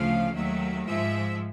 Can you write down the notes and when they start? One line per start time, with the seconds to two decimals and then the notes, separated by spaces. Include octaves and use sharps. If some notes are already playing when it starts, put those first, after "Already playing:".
Already playing: D2 C#3 F3 A3 F5
0.33 D#2 D#3 F#3 A3 E5
0.86 G#2 F3 G#3 E5